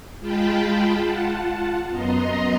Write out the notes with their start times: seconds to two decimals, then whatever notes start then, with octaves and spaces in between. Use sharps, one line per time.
0.20 G#3 F4 G5 A5 B5
1.01 F4 F#5 A5
1.89 F#2 B3 D#5 A#5 C6